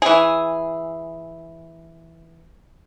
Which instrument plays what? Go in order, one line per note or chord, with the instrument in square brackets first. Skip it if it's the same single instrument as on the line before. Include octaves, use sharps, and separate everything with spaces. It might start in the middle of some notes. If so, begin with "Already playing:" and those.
[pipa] E3 G#4